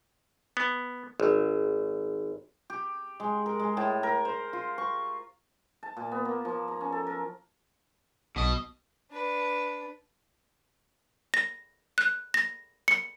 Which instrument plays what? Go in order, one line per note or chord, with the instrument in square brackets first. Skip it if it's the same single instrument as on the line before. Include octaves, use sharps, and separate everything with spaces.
[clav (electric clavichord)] B3
G#1
[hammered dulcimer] G4
G#3
A#4
G#3
A2
A#4
C5
F4
C#6
A5
A#2
B3
A#3
F3
A#5
C#4
A4
A#4
[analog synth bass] B1 [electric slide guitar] B2 D#5
[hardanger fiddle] D4 B4
[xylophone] A#6
F#6
A#6
C#7